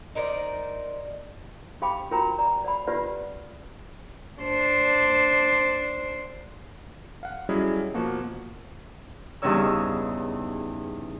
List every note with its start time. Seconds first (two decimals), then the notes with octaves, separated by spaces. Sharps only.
0.15 D#4 A#4 C5 D5
1.82 G4 F5 G5 B5 D6
2.11 F4 F#4 A#4 G5 A#5 B5
2.38 D5 A#5
2.64 D5 F#5 B5
2.87 F4 G4 B4 D5 F#5
4.41 D4 C5
7.23 F5 F#5
7.49 F#3 G3 C#4 E4 G#4 D#5
7.94 B2 F3 A#3 F#4
9.42 E2 G2 C#3 D#4 C#5 E6